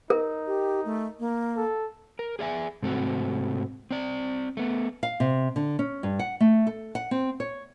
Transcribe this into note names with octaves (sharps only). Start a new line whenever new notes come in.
D#4 A#4
G4
A3
A#3
A4
A#4
G#4 D5 E5 G#5
G#2 C3 A3 C4 F#4
C4 D5
A3 B3
F5
C3
D3
C#4
G2
F#5
A3
A4
F#5
C4
C#5